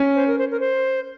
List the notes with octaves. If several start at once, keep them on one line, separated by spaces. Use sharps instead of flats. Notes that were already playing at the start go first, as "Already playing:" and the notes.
Already playing: C#4
C5
A#4
C5
A#4
C5